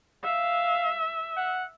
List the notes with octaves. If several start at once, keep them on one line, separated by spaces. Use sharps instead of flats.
E5 F5
F#5